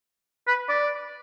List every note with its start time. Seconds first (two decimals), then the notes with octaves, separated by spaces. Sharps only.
0.47 B4
0.69 D5